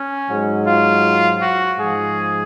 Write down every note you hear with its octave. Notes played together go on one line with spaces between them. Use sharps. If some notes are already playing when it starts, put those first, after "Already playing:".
Already playing: C#4
G#2 F#3
F4
F#4
G#2 F3 G#4